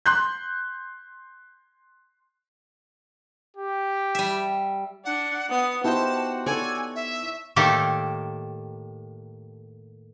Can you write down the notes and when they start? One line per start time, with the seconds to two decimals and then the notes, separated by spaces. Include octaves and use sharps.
0.06 C6 F#6 G6
3.57 G4
4.15 G3 E5
5.05 D4 F#5
5.50 B3 D#6
5.84 B3 D#4 E4 F#4 G4 C5 A5
6.46 A4 C#5 D5 G#5
6.95 E5
7.56 A2 D#3 A#3 G4 A4